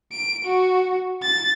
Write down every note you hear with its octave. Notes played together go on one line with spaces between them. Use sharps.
D7
F#4
A6